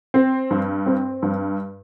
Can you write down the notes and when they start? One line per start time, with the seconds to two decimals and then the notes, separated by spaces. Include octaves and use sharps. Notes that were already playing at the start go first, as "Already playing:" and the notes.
0.14 C4
0.50 G2
0.86 C4
1.22 G2